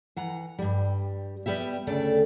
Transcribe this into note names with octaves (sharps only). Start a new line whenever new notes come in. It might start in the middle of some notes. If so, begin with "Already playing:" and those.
E3 F#5 A#5
G2 G3
G3 B3 G4 E5
D2 C#3 A3 A4 D5 G5